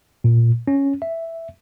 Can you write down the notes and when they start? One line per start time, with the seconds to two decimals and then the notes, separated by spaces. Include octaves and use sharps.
0.24 A#2
0.68 C#4
1.02 E5